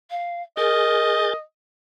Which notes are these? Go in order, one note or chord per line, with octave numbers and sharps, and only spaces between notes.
F5
G#4 A#4 D#5 G6 A6